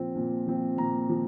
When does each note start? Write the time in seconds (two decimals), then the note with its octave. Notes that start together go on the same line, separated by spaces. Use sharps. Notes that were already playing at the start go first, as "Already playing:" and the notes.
Already playing: A#2 F3 C4
0.15 A#2
0.47 F3 C4
0.78 A#2 A#5
1.09 F3